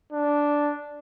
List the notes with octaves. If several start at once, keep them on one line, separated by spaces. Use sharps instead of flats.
D4